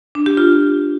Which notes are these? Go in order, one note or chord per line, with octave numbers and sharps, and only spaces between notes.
D4
G4
F4